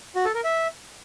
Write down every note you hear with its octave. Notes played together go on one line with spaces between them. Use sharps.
F#4
A4
A#4
E5